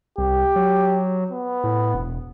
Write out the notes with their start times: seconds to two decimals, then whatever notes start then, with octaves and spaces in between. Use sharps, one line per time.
0.18 C2 G4
0.56 F#3
1.32 B3
1.64 A2
1.94 E1